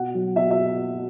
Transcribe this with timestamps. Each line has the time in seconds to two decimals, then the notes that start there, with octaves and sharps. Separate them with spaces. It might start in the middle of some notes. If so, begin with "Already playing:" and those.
Already playing: B2 F#5
0.14 F#3
0.36 B2 E5
0.51 E5